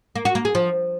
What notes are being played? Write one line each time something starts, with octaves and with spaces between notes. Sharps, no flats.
A#3
F#4
A#3
G#4
F3